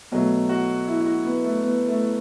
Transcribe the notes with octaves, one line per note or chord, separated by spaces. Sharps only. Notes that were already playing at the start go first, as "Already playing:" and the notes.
B2 F#3 A3
F#4
E4
E4
F#4
B3
A3
B3
A3